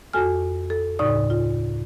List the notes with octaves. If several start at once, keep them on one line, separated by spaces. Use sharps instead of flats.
F2 F#4 A4 G#5 F6
A4
D2 A2 C#3 D#4 D5 D#6
F4